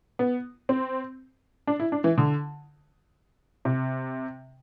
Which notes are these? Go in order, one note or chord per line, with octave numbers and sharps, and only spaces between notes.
B3
C4
D4
E4
D4
E3
D3
C3